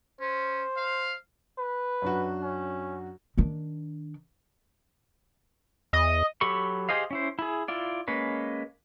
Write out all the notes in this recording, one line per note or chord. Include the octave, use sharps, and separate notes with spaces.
C#4 C5
F5
B4
F#2 D4 F#4
C#4
D#3 D4
E2 D#5
F#3 G4 A4 B5 C#6
G4 G#4 C5 D#5 F5
C#4 E4 C5
E4 G#4
E4 F4 D5
G#3 A#3 C#4 B4